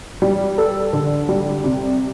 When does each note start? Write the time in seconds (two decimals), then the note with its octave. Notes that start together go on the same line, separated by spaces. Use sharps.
0.22 G3
0.58 A4
0.93 D3
1.29 G3
1.64 C3